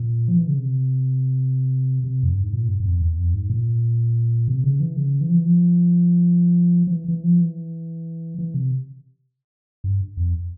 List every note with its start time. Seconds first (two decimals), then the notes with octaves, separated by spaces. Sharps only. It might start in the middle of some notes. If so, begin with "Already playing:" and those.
Already playing: A#2
0.28 F3
0.37 E3
0.48 C#3
0.58 C3
2.04 C3
2.23 F2
2.33 G2
2.42 G#2
2.53 A#2
2.68 G2
2.80 G2
2.86 F2
3.02 E2
3.17 F2
3.34 G#2
3.50 A#2
4.48 C3
4.64 C#3
4.80 E3
4.97 C#3
5.21 E3
5.29 F3
5.36 E3
5.45 F3
6.87 F3
6.92 E3
7.08 E3
7.24 F3
7.41 E3
8.38 E3
8.54 C3
9.84 G2
10.17 F2